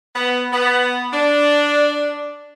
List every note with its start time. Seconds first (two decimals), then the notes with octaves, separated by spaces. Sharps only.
0.15 B3
0.52 B3
1.12 D4